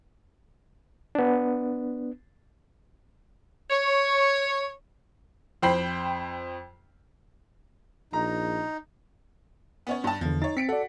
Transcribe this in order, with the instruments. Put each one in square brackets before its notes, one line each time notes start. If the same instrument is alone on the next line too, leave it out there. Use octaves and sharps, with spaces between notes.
[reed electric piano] B3 D4
[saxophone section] C#5
[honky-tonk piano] F2 C5 G5 B5 C7
[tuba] A#1 [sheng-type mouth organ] D#4 [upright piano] A#5
[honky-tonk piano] B3 C#4 C#5
G2 A5
[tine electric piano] E2 D3 [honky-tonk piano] F3
[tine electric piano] D#4 [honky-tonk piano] C#5 A6
[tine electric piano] C4 [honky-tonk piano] B6 C#7 D7
[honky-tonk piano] F#4 [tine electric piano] A4 D5